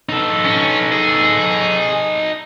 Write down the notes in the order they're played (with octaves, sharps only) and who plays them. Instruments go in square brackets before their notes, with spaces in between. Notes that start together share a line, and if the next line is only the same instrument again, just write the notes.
[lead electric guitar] D#4 A4
[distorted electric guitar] C#4
G#4